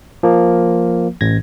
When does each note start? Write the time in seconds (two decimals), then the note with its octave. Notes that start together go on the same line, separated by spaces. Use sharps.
0.23 F3 A#3
1.21 A1 G#6 A#6